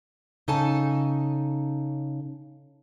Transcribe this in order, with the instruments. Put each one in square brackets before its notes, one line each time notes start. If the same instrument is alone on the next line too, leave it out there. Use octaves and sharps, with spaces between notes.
[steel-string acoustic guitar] C#3 D#4 A4 G#5 A5